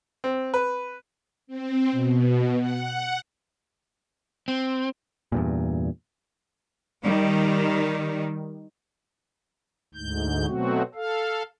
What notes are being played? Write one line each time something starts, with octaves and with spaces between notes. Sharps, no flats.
C4
B4
C4
B2
F#5
C4
E2 G2 A#2
D#3 G3
D2 G#2 G6
B2 F#3 A3 C4 F#4
A4 F5